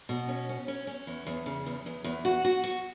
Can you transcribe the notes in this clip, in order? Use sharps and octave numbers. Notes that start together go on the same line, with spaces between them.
B2
C#4
C#4
C#4
C#4
E2
E2
C#3
E2
E2
E2
F#4
F#4
F#4